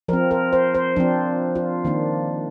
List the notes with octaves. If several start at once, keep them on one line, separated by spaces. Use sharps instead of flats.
F3 C4 A#4
A#4
C5
C5
F3 C4 D4
F4
D#3 A#3 D4